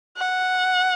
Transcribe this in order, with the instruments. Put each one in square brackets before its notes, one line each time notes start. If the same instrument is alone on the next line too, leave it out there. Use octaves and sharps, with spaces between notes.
[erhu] F#5